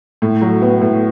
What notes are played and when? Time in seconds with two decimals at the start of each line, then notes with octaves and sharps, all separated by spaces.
0.22 A2
0.42 F#3
0.62 B3
0.81 A2